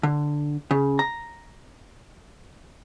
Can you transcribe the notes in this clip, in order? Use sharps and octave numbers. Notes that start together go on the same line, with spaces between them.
D3
C#3
A#5